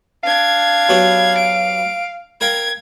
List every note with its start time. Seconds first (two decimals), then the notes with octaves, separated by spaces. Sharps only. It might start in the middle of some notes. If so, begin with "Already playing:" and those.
0.24 D4 F5 G#6
0.89 F#3 B3 G4
1.37 D7
2.41 A#4 F5 G5 G#6